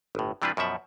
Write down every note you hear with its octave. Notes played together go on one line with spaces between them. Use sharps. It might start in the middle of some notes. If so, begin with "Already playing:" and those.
G1 A2
C3 E3 G3 D4 F4 B4
F#2 B2 F3 E5 F#5